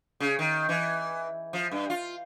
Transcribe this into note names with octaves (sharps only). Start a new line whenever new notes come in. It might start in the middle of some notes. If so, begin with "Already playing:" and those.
C#3
D#3
E3
F3
G2
F4